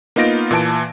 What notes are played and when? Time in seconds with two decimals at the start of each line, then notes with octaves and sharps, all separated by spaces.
0.16 A#3 B3 D#4 F4 A#6 D7
0.51 A#2 E3 A5 D7